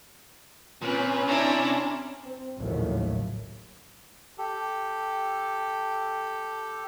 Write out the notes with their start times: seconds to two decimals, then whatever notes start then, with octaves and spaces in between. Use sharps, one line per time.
0.82 A#2 C4 C#4 B4
1.28 C3 D4 E4 C#5 A#5
2.23 C4
2.59 A#1 D#2 A2 C#3 F#3 A3
4.38 G4 A4